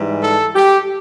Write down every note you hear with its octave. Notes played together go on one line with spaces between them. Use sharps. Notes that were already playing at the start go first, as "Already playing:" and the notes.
Already playing: G#2 E3 G3
A4
G4